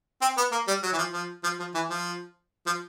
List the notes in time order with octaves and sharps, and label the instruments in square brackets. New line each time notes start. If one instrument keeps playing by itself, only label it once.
[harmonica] C4
B3
A#3
G3
F#3
E3
F3
F3
F3
F3
E3
F3
F3